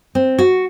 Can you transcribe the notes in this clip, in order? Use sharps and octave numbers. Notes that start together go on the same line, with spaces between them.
C4
F#4